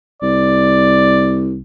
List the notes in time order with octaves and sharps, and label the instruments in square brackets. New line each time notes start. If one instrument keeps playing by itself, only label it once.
[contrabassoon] C2 [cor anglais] D5